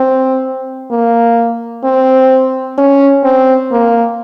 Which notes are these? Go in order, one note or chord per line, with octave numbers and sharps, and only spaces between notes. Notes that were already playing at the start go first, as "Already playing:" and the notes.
Already playing: C4
A#3
C4
C#4
C4
A#3